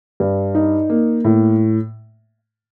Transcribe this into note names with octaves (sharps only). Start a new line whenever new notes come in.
G2
D#4
A#3
A2